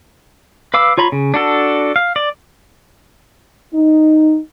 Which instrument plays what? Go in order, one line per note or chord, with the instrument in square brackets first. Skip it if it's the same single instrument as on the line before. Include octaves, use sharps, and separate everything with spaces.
[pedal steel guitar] B4 F5 D6 E6
F4 C#5 A#5 B5
C#3
D4 F#4 A4
F5
D5
[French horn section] D#4